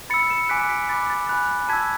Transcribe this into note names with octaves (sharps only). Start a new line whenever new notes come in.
B5 E6 A6 C#7
C#7 E7
G#5 D6 F#6 B6 D7
B6 D7
B5 D6 F#6 A6
A6
G#5 B5 F#6
A5 E6 G#6 B6